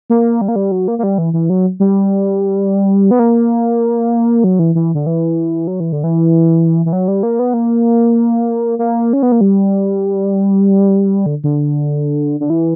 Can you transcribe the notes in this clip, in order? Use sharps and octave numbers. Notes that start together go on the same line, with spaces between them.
A#3
G3
A#3
G3
F#3
A#3
A#3
G3
E3
E3
F#3
G3
B3
A#3
F#3
E3
E3
D3
E3
F#3
E3
D3
E3
E3
F#3
G3
A#3
B3
A#3
A#3
C#4
B3
A#3
G3
D3
D3
D3
E3